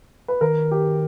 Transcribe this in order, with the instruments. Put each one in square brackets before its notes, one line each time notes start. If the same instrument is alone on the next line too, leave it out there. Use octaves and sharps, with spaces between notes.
[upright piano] B4
[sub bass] D#3 [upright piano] A#4
[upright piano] G4